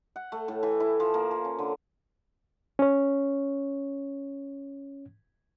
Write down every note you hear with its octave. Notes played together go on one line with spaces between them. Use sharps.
F#5
A3
A2
E3
E4
F3
A#3
F3
C#4
D3
C#4 C#5